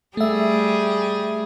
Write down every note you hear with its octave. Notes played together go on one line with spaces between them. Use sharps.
G3 A3 G#4 E5